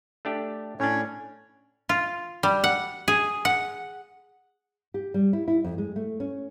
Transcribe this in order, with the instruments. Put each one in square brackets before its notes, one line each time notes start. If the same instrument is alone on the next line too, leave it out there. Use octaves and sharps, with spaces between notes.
[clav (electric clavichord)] A3 D4 G4
[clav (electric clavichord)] A2 D4 [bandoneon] C#4 C#5
[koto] F4
G3
F#5
G#4
F#5
[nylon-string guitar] G4
G3
E4
E4
F2
G#3
A3
C#4